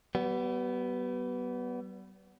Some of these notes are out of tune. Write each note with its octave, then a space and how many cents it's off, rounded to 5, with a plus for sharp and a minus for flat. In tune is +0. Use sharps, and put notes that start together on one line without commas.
G3 -40 B3 +0